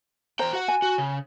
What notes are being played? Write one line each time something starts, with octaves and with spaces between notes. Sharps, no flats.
E2 C5 G5 A#5
F#4 F#5
G#5
F#4
C#3